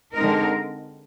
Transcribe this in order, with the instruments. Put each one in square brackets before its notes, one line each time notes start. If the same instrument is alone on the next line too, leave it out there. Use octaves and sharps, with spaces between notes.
[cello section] D3 G#3 C4 D#4 A#4